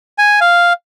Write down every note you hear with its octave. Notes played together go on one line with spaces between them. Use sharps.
G#5
F5